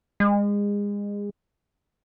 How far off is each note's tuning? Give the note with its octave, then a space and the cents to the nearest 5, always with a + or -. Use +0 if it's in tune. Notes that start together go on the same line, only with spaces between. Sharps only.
G#3 -30